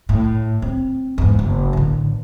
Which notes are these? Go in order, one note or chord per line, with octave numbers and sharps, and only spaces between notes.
A2
C4
E2 G#2
F#1
A1 D3